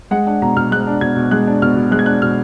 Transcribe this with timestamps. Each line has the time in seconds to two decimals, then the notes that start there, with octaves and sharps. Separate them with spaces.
0.11 G#3 F#5
0.26 D4 F#5
0.42 B2 A#5
0.56 B2 F6
0.71 G#3 F#6
0.87 D4
1.01 B2 G#6
1.16 B2
1.31 G#3 F#6
1.47 D4
1.62 B2 F6
1.76 B2
1.91 G#3 F#6
1.99 G#6
2.06 D4 F#6
2.22 B2 F6